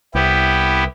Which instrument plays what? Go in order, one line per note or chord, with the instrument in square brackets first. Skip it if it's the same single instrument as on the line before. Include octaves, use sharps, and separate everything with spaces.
[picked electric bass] C2 [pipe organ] B3 E4 G4